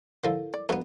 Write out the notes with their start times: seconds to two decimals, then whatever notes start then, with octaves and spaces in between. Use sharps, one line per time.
0.24 D3 F3 E4 A4 A#4
0.54 D5
0.69 F2 D3 F#3 B3 B4